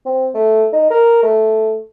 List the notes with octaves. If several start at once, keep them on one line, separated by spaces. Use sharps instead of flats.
C4
A3
D#4
A#4
A3